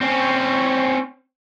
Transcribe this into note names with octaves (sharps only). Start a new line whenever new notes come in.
C4 C#4